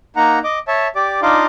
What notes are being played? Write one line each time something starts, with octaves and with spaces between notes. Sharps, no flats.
A#3 D#4 F#5 A#5
D#5 D6
C#5 E5 A5
G4 D5 D6
D4 D#4 F4 D#5 F5 D6